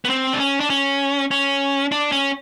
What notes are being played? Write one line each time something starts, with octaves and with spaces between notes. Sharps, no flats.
B3
C4
D4
C#4
D4
C#4
C#4
D4
C#4